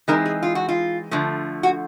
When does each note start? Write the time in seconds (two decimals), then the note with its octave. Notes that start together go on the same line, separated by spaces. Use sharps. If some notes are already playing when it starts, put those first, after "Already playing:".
0.08 E3 G#3 C4 D#4 A#4
0.26 G#4
0.42 F4
0.55 F#4
0.69 F4
1.11 D3 F3 A3
1.63 F#4